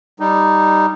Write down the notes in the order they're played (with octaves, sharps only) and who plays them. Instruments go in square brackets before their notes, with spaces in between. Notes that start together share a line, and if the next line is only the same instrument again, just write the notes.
[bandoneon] G3 D#4